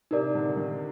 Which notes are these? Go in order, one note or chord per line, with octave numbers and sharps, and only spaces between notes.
C3 D#4 A#4 D5
D3
D#3